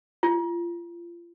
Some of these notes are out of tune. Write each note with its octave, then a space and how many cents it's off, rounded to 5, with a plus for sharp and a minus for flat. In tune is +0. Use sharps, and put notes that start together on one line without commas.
F4 -30